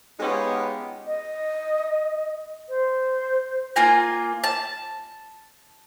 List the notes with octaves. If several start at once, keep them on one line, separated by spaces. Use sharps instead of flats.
G#3 B3 C#4 D#4 F4 G4
D#5
C5
A#3 F4 G#5 A#5
A5